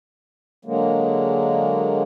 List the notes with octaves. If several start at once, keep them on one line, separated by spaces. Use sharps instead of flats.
D3 F#3 G#3 A#3